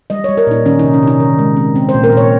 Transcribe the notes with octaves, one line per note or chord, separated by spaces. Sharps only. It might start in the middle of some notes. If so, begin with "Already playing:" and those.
G3 D#5
G3 C#5
A#4
A#2 D#4
D#3 C#4
C3 D#4
C#4
C3 D#4
D#3
G#3
C4
C4
C5
A#2
A#4
A#2 C#5